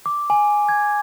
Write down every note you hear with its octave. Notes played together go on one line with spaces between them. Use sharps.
D6
G#5
G#6